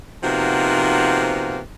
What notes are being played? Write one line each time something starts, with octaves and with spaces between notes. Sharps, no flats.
C3 F3 A#3 B3 D#4 F#4